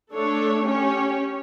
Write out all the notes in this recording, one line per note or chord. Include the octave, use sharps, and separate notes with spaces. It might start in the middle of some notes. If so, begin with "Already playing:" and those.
A3 D4 A4 C#5
C#4 G4 C#5